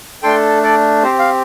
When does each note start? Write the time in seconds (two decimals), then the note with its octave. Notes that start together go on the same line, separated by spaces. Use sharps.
0.23 A3 D4 A4 G5 C6
0.63 A4 D5
1.03 C4 G4 C5
1.19 F5